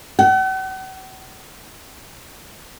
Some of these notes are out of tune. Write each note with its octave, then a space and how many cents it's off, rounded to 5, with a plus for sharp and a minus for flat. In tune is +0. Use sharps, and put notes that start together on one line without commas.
F#5 +45